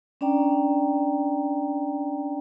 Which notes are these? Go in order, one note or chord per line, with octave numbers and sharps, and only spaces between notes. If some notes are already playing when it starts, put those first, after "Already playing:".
C#4 D4 D5 G5 A#5